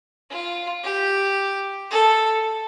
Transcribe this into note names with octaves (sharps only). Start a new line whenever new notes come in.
F4
G4
A4